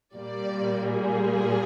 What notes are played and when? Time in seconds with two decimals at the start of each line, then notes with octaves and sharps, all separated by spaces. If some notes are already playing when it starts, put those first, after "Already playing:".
0.15 A#2 G3 A#3 D5
0.91 G#4